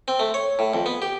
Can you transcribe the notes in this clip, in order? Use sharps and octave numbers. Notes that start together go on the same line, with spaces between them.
C4
A3
C#5
A2
F2
B3
G4